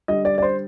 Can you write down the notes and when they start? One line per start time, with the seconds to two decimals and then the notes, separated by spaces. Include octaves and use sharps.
0.08 D3 G3 D#5
0.25 D5
0.38 D5
0.42 C5